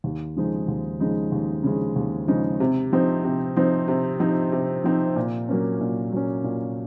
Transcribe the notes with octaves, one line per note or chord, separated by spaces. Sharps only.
D#2
C#3 F3 G#3 D#4
D#2
C#3 F3 G#3 D#4
D#2
C#3 F3 G#3 D#4
D#2
C#3 F3 G#3 D#4
C3
F3 C4 D#4
C3
F3 C4 D#4
C3
F3 C4 D#4
C3
F3 C4 D#4
A#2
F#3 A#3 C#4
A#2
F#3 A#3 C#4
A#2